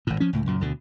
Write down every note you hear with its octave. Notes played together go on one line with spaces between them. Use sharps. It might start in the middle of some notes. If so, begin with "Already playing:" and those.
G#1 A2
F3 C#4
C#2 A2
C#2 F#2 A#2
D2 B2 D3